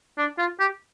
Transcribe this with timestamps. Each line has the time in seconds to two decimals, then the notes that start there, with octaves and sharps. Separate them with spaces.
0.18 D4
0.39 F4
0.60 G4